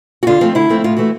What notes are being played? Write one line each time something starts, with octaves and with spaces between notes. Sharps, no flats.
F#4
D3 F4
F3 A3 C4
D3 E4
F3 A3 C4
A2 F4
E3 A3 F#4